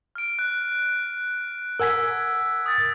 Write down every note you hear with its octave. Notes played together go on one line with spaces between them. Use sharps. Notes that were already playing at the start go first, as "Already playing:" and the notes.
F6 D7
F#6
A#4 F#5 G#5 E6 G#6 B6
D#6 A6